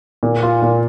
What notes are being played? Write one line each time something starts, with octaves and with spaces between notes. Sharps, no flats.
A#2
F4
A#2